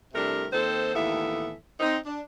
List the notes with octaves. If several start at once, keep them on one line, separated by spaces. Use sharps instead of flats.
C3 G3 A3 D4 E4 A#4
D#3 A#3 C4 A4 C5
D#2 A2 E3 B3 A4 E5
C4 D#4
D4